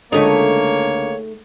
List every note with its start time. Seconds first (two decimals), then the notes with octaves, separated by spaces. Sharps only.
0.12 C#2 D3 A3 A#3 D#4 C#5